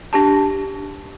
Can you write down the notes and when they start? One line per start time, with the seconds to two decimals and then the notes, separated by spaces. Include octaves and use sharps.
0.13 D4 G4 A5